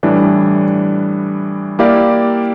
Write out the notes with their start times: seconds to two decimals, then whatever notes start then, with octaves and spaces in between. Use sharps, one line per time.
0.03 A2 E3 G3 D4
1.79 A#3 E4 G4 D5 F5